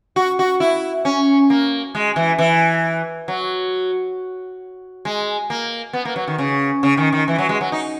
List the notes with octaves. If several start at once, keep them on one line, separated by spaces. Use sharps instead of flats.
F#4
F#4
E4
C#4
A#3
G#3
E3
E3
F#3
G#3
A#3
B3
A#3
F#3
D#3
C#3
C#3
D#3
D#3
E3
F#3
G#3
F#3
D#4